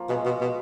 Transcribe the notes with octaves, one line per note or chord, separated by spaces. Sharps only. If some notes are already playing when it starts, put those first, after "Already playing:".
Already playing: F3 A#3
B2 G#3
B2
B2